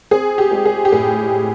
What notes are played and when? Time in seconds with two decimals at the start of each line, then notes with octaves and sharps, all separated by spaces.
0.11 C4 G#4
0.38 G4
0.51 G#3
0.65 G#4
0.85 G4
0.92 A2 G#4